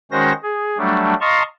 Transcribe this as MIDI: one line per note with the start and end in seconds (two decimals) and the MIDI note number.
0.11 0.33 51
0.11 0.33 56
0.11 0.33 61
0.11 0.33 66
0.11 0.33 72
0.11 0.33 94
0.43 0.78 68
0.78 1.14 54
0.78 1.14 55
0.78 1.14 57
0.78 1.14 62
1.21 1.43 75
1.21 1.43 77
1.21 1.43 81
1.21 1.43 82
1.21 1.43 84
1.21 1.43 85